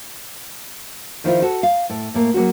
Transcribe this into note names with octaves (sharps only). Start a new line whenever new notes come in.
D#3 F3 E4 F4
F#4 A4
F5
A2
A2 A#3 A#4
F#3 A#3 C#4 F#4